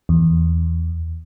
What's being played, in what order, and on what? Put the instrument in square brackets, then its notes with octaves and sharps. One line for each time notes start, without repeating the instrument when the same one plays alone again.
[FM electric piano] E2